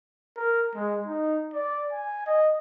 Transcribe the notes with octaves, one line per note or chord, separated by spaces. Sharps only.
A#4
G#3
D#4
D5
G#5
D#5